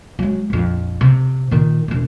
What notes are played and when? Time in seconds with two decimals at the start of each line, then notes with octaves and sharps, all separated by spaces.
0.19 F#3 G#3
0.50 A#1 F2
1.01 C3
1.51 A#2 D#3
1.88 E1 A3